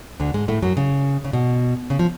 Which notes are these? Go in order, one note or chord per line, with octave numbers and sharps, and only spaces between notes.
D2 D3
G#2 G#3
A2 A3
F#2 F#3
C#3
C#3
B2
C#3
F3